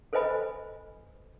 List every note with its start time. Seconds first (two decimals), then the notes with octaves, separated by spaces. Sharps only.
0.13 A4 B4 C5 D#5 G#5 B5